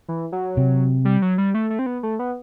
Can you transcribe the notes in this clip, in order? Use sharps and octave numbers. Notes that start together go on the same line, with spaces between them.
E3
F#3
C3
G3
F#3
G3
A3
A3
C4
B3
A3
B3